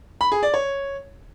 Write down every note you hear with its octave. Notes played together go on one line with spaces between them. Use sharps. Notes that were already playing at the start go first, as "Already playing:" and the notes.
B5
G#4
D5
C#5